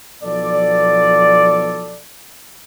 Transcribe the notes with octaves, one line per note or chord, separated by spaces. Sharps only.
B1 F3 B3 A4 D5